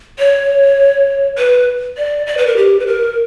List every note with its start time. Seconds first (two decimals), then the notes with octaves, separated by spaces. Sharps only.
0.19 C#5
1.38 B4
1.97 D5
2.27 D5
2.37 B4
2.47 A#4
2.57 G4
2.80 B4
2.87 A#4